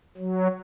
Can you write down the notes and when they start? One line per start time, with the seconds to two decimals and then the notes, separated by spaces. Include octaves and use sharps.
0.18 F#3